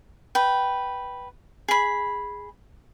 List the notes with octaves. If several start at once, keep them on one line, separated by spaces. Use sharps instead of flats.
B4 G5
G#4 B5